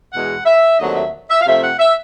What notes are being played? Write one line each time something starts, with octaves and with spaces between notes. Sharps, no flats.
E2 B2 G#3 F#5
E5
D#2 D3 F#3 A3 C4 D#5
E5
E5
F5
C3 F3 A3 C4 E5
F#5
E5